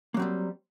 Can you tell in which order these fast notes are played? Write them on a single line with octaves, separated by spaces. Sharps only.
A#3 F#3 C4 G3